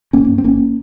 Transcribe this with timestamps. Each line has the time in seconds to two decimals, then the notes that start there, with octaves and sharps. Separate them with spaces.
0.13 G#1 A#3 C#4
0.28 G2
0.38 C4
0.44 G#1 A#3 C#4